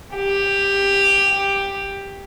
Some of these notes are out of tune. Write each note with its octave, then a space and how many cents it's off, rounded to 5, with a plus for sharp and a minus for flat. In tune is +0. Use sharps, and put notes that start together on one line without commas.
G4 +10